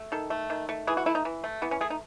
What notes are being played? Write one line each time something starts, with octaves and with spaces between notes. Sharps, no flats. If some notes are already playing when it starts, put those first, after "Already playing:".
Already playing: A3
D#3 A4
A3
D#3
A3
E3 G#4
F#4
A3 E4
D#4
E3
A3
E3 B3
C#4
A3 G#4
D#4